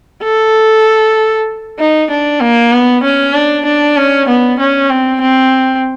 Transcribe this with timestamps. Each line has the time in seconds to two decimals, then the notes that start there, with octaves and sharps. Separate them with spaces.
0.23 A4
1.79 D#4
2.10 D4
2.41 A#3
2.72 B3
3.03 C#4
3.34 D4
3.65 D4
3.96 C#4
4.28 B3
4.59 C#4
4.90 C4
5.21 C4